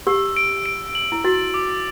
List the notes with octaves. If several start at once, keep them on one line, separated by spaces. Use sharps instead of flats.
G4 E6
D7
D7
F#7
E4
F#4 A6
D6